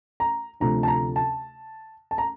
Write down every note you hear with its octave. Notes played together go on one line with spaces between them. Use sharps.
A#5
D2 C3 F3 A3 A#5
A5
A#5
A5
A5
A#5